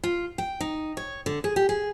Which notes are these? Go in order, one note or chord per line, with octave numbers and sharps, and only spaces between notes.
F4
G5
D#4
C#5
D3
G#4
G4
G#4